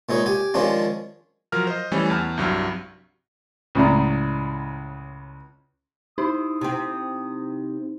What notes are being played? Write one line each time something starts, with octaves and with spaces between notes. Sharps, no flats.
A#2 G#3 D#4 C#5
G4 G#5
D#3 F3 G#3 C#4 D4 F4
F3 F#3 A#4 F6
C5 D#5
E3 G3 A3 C#4 A4
E2 A5 F6
C2 G2 F#3 E6 F6
C#2 A2 C#3 D5 A#5
D#4 E4 C5 D#6
C3 C4